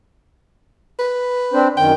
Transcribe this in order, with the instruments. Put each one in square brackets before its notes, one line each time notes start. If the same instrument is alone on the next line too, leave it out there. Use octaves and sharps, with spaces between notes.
[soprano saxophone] B4
[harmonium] C4 D4 C5
[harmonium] F#2 D#3 [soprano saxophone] G5